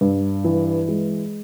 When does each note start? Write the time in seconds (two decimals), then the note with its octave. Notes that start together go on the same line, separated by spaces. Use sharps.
0.01 G2
0.44 E3
0.88 G#3